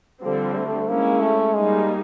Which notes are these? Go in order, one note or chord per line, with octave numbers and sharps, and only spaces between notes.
D3 F3 G3 C4
A3
G#3 A#3 C#4 E4
A3
G3 G#3 A#3 D#4 G#4